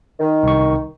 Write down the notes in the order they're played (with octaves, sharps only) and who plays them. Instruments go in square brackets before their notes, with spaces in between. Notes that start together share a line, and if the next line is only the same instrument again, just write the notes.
[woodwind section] D#3
[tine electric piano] C2 C#6